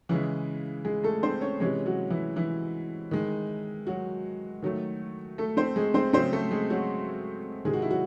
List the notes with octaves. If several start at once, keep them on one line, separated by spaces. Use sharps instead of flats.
C#3 E3 G#3 E4
G#3 G#4
A3 A4
C4 C5
C#4 C#5
C3 E3 G#3 C#4 C#5
F#3 F#4
E3 E4
E3 E4
D#3 G#3
F#3 F#4
D#3 F#3 A3
A3 A4
C4 C5
G#3 G#4
C4 C5
C#3 F#3 A3 C4 C5
A3 A4
G#3 G#4
F#3 F#4
C3 D#3 G#3 G#4
F#4
E4
F#3 F#4